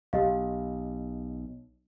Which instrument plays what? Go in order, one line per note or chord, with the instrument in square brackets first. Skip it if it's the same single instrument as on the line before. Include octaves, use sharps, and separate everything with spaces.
[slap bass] B1 [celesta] G4 D#5 F5